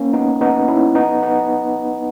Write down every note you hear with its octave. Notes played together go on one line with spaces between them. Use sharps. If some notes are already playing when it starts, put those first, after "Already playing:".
Already playing: A#3 C#4
B3 D#4
B3 D#4
C#4 E4
B3 D#4
B3 D#4